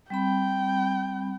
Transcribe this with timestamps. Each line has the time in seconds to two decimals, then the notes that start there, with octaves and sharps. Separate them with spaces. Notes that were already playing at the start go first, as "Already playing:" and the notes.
0.10 G3 C4 G5 B5